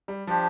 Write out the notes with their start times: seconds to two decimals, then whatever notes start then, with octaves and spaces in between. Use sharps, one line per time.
0.08 G3
0.27 F3 D4 G4 C5